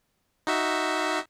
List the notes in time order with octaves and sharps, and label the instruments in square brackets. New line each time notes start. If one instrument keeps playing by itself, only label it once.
[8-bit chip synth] D#4 F#4 E5